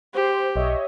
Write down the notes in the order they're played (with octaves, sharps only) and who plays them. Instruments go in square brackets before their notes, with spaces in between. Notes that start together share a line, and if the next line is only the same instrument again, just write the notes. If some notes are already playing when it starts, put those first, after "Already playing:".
[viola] G4 [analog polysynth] C5
[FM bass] B1 [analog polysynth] C#5 D#5 E5